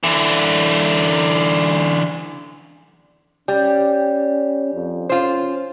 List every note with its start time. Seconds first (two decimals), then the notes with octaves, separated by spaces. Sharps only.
0.04 D3 E3
3.48 G3 C#4
4.74 F2
5.10 C#4 F4 C5